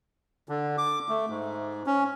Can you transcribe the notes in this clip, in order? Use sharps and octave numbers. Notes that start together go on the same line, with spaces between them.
D3
D6
A3
G#2
C#4